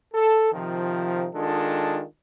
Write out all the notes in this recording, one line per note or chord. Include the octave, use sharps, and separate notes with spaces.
A4
C3 D#3 F3
D#3 G#3 D4 F4 A4